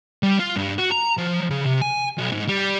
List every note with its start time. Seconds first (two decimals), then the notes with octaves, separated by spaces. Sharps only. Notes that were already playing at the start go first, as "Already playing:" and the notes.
0.23 G3
0.39 F4
0.56 G2
0.79 F#4
0.92 A#5
1.18 F3
1.50 C#3
1.65 C3
1.81 G#5
2.18 B1
2.32 G#2
2.48 G3